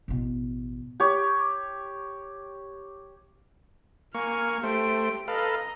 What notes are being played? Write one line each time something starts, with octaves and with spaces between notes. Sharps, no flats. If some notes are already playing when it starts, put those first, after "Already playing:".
A1 B2
G4 C#5
A#3 G#5 C#6 F6
A3 G4 C5 D7
A4 B4 D#5 F5 A#5